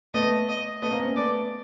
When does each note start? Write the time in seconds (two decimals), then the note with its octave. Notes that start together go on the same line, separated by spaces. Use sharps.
0.14 A3 B3 D#5
0.49 D#5
0.82 A3 B3 D#5
0.91 A#3 C4
1.00 B3 C#4
1.16 A3 B3 D5